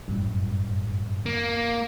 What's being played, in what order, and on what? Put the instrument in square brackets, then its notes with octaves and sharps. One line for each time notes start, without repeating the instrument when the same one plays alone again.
[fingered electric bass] G1 A2 G3 [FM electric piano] F#2
[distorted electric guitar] A#3